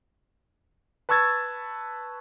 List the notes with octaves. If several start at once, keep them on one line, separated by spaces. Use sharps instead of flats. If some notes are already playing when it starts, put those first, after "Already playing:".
B4 A5 C#6 E6 G#6 A6